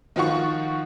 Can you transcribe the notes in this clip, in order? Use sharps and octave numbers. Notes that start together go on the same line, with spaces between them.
D#3 F3 F4 F#4 C#6